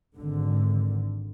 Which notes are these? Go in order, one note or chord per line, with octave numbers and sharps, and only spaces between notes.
G#1 D3